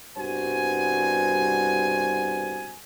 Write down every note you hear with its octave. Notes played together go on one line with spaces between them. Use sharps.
C2 G2 B2 F#4 C5 G#5